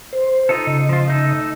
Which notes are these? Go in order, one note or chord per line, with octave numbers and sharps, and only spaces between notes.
C5
D#4 F4 A4
C#3 D#5
F3 F4
A3 D#4 A4